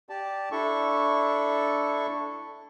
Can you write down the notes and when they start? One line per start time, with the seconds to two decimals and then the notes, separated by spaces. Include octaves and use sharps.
0.09 G4 D5 A5
0.51 D4 E4 A4 C#6